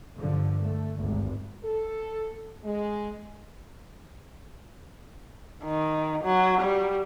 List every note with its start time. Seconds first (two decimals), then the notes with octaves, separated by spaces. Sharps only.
0.17 G2 D3 F3
0.65 A3
1.01 G#1 D2 G2
1.64 A4
2.64 G#3
5.64 D#3
6.24 F#3
6.61 G3